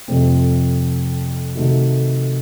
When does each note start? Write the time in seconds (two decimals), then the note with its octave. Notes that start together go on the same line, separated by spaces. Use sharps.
0.08 F2 C3 F3 A3 C4
1.55 C3 D#3 A3 D#4 F#4